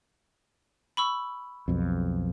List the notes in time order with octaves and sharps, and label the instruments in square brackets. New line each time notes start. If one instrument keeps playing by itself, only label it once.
[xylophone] B5 C#6 E6
[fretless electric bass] B1 F2